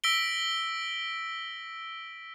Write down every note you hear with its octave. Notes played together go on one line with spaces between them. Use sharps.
E6 A#6 B6 D7 G7